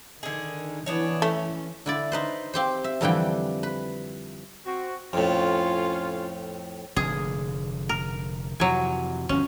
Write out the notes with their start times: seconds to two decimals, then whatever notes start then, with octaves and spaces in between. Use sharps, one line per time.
0.23 D3 D#3 G#4
0.86 E3 B3 D4 C#5
1.22 A3 C#4
1.86 D3 E4 D5
2.12 D#4 B4 C5
2.54 C4 G4 C5
2.84 E5
3.01 F2 D3 E3 G3 G5
3.63 B4
4.65 C4 F#4
5.13 F2 A2 C#4 F4
6.96 F1 A#2 D3 G#4
7.89 A#4
8.60 F2 C3 E3 F#3 G#5
9.29 G1 F2 F3 C#4